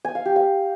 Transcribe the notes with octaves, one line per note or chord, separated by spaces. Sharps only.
G#5
F5
G4
F5